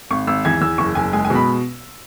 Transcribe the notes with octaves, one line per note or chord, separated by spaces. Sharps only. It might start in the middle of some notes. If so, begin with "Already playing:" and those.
G#1 C#6
G#1 E6
E2 G#6
E2 E6
F#1 C#6
F#1 G#5
G#3 G#5
G#5
B2
B5